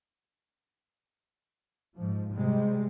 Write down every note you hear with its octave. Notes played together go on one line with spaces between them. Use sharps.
G#2 F3
C3 G3 G#3